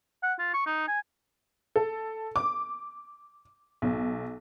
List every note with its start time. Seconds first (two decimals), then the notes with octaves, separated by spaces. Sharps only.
0.23 F#5
0.39 F4
0.54 C#6
0.66 D#4
0.88 G#5
1.76 A4
2.36 D6
3.82 B1